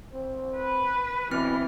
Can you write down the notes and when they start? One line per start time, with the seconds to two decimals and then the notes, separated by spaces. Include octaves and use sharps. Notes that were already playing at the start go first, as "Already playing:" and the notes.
0.13 C4
0.57 B4
1.31 B2 E3 C4 E4 F6